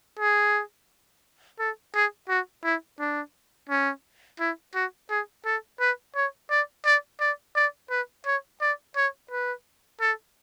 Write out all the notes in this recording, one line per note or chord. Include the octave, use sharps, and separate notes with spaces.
G#4
A4
G#4
F#4
E4
D4
C#4
E4
F#4
G#4
A4
B4
C#5
D5
D5
D5
D5
B4
C#5
D5
C#5
B4
A4